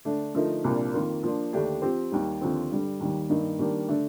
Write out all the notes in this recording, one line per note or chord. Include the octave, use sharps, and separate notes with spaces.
D3 A3 D4
D3 F3 A3 D#4 A#4
C2 A#2 F3 A#3 D4
F2 D#3 A#3 F4 A#4
F3 A#3 D4 F4
D#2 D3 A3 D4 G4
F3 C4 G4 C5
D#2 D#3 G3
D#2 D3 F3 C4
G2 D3 G3
D#2 D#3 G3
G2 D#3 A#3 D#4
D#3 G3 A#3 D4 G4
D3 A3 D4 A4